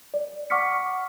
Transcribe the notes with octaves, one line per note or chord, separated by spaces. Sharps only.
D5
F#5 C#6 D6 F6 B6 C#7